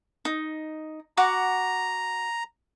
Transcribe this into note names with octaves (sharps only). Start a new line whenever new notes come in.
D#4
F#4 F#5 A#5 D6